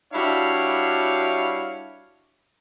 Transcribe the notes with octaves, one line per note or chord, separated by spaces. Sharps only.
G3 D4 E4 F#4 C#5 F5